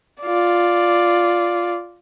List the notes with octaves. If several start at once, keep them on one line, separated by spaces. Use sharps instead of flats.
F4 D5